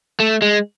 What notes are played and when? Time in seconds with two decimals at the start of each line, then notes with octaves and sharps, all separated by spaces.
0.20 A3
0.42 G#3